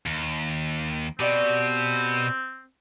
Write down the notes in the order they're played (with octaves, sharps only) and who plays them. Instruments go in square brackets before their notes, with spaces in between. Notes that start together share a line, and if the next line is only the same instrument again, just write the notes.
[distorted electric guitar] D#2
[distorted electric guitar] B2 [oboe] C4 [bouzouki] G4 D5 D#5